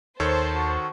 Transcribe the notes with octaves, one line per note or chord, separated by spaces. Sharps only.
D#2 D#3 A4 C5 C#5 A5
F#4